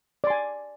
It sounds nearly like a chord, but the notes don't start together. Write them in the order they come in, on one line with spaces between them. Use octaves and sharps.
D5 C6 G#5